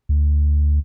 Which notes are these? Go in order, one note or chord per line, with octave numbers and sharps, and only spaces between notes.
D2